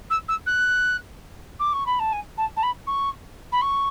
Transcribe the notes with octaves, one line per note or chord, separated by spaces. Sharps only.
E6
E6
F#6
D6
C#6
B5
A5
G#5
A5
A5
B5
C#6
B5
C#6